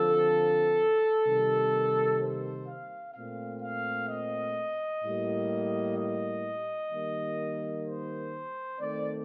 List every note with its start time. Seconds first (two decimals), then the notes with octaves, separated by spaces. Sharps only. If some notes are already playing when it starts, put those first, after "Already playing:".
Already playing: D3 F3 C4 A4
1.26 C3 D#3 G3 A#3
2.21 C5
2.68 F5
3.15 A#2 A3 C4 F5
3.62 F5
4.09 D#5
5.04 A2 G3 A#3
5.98 D#5
6.92 D#3 G3 A#3
7.86 C5
8.80 D#3 A3 C4 D5